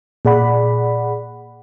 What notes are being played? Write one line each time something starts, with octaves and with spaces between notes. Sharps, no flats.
A#2 G#4 D5 F#5 B5